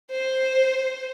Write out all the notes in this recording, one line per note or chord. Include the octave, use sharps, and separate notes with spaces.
C5